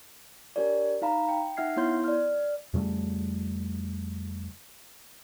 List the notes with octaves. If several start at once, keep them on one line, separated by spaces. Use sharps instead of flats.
D4 G4 A#4 C#5 D5
D#4 F5 A#5 B5
G5
D#4 E5 F#5 F6 G#6 C7
B3 E4 C#5 C6 G6
D5 F6
F2 C#3 G3 A3